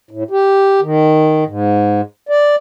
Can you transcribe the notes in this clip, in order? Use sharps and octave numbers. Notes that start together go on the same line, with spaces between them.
A2
G4
D#3
G#2
D5